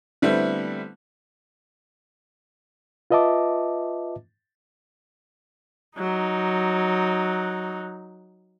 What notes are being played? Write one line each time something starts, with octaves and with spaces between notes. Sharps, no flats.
D3 G3 A3 B3 C4 E4
F4 B4 D#5 E5 A5 D6
F#3 D#4